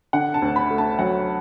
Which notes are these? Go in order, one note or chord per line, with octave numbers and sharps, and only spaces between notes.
D3 F#5
A5
D2
B5
A3
A5
F#3 F#5